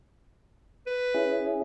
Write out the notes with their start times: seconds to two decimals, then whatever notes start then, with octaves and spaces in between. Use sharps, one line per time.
0.87 B4
1.14 C#4 E4 G#4